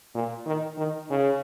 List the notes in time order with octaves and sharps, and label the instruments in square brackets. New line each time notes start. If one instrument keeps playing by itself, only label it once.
[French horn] A#2
D#3
D#3
C#3